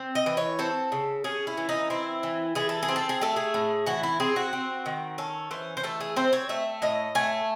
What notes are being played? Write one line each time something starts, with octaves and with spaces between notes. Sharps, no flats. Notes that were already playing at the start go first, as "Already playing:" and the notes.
Already playing: C4
D#5
E3
C#5
C4 A4
C#3
C#4 G#4
E4
E3
D#4
C4 E4
E3
E3 G#4
A4
G#4
C4
A4
G#4
A3 A4
G#4
A2
E3 F#4
E4
C4 G#4
F#4
C4
D#3
C#4 A4
E3 C5
C5
A3 A4
G#4
C4 C5
C#5
A3 E5
A2 D#5
A3 G#5